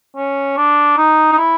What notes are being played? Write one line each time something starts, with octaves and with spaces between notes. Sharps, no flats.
C#4
D4
D#4
D#4
E4